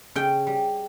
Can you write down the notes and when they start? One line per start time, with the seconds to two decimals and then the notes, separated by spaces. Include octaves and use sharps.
0.16 C#3 G5
0.47 G3